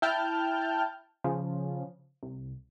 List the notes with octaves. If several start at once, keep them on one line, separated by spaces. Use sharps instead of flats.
E4 G5 A5 F6 G6
C#3 F3
C2